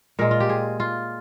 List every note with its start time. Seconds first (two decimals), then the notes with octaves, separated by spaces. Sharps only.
0.19 A#2 G#3 A#4
0.31 F4
0.40 G4
0.49 G#4
0.80 F4